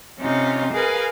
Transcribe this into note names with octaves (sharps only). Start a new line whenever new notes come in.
C3 C#4 D#4 F4
G#4 A#4 B4 F5 G#5